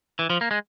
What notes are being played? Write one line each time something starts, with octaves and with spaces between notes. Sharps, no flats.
E3
F3
A#3
G#3